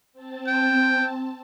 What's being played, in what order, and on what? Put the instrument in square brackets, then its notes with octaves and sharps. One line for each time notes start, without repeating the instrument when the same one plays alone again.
[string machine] C4 A5
[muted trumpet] G5